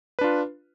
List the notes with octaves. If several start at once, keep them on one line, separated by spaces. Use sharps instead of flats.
D4 F4 B4